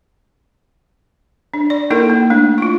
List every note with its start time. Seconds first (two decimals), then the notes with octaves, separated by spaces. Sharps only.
1.54 D4
1.70 D5
1.90 A#3 D#4 E4 A4 A#4
2.10 A#3
2.30 A3 D4
2.58 E4 F4